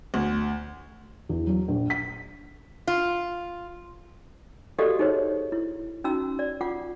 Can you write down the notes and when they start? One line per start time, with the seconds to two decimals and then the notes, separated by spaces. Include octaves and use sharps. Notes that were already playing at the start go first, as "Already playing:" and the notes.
0.14 D2
1.29 E2
1.47 F#3
1.68 A#1
1.90 B6
2.87 F4
4.78 F#4 G4 A4 D5 D#5 F5
4.99 D#4 G#4 C5 C#5
5.52 E4
6.04 C#4 D#4 F#4 A#5 E6
6.39 D5
6.61 F4 F#5 D6